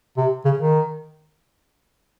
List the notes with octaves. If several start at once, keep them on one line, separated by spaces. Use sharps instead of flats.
C3
C#3
D#3